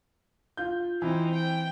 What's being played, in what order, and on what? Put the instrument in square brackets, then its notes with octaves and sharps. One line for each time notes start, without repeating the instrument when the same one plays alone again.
[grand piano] F4 G6
[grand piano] E3 [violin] C4 D#4
[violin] G5